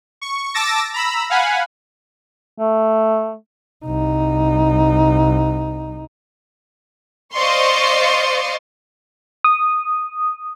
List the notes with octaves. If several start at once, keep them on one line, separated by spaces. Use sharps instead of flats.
C#6
A5 D6 E6 A6 A#6
A#5 B5 E6
F5 F#5 G#5 B5
A3
C2 D#4
C5 D5 D#5 F5 C6 C#6
D#6